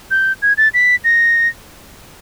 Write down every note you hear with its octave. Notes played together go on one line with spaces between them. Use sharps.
G6
G#6
A6
B6
A#6